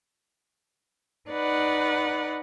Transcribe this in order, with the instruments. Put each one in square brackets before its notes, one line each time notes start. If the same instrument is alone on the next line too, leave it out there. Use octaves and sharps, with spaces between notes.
[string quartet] D#4 B4 D5 F#5